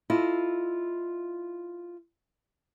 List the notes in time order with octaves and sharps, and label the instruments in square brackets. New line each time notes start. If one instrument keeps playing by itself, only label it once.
[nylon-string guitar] E4 F4 A4 D#5